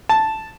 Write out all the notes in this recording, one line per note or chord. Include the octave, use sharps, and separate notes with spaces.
A5